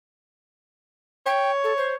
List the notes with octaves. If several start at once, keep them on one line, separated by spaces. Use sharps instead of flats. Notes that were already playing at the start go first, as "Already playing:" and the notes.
C#5 G5
A4
C5